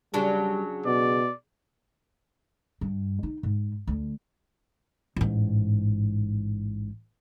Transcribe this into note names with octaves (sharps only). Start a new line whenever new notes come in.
C#3 F#3 G3 D4
B2 D5
G2
D#4
G#2
D2
A1 G#2